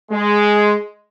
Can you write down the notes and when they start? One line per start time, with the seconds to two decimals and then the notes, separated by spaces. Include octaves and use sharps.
0.11 G#3